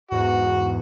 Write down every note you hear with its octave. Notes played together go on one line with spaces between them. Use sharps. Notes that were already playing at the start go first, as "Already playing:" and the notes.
E2 G#2 F#4